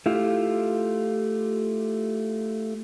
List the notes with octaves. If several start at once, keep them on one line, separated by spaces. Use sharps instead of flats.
A3 E4 F4 G4